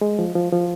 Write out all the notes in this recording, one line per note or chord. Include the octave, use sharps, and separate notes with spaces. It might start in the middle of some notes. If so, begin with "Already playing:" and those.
G#3
F3
F3
F3